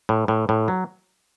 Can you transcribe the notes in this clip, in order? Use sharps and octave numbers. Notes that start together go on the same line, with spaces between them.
A2
A2
A2
F#3